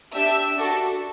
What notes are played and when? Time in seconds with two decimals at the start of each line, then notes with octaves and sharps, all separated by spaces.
0.14 D4 G4 E5 E6
0.57 D4 F#4 A4